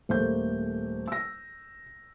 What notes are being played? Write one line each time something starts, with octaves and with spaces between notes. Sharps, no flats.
D#1 A3 A#3 C5 G6
E6 A#6